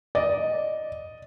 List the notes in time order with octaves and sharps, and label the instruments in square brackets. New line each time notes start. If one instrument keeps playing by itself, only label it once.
[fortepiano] D5 [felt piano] D#5